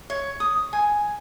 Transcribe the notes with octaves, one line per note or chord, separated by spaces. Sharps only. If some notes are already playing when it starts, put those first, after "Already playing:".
C#5
D#6
G#5